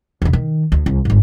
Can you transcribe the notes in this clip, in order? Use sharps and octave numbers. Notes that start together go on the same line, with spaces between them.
E1 D3
D#3
D2
C2
G1 G#2